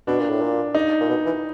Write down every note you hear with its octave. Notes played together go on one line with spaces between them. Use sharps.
B2 D4
A#2
A2
A#2
D#4
A#2
B2
E3